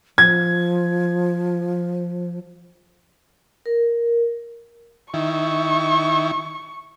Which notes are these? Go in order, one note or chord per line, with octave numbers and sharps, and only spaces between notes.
F3 G#6
A#4
D#3 E4 C#6